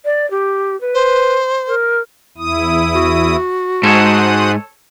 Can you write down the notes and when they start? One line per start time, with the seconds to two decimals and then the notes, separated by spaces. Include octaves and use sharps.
0.05 D5
0.30 G4
0.80 B4
0.94 C5
1.67 A#4
2.38 E2 E4 D#6
2.94 F#4
3.83 G#2 A4 C5 C#5 F#5 D#6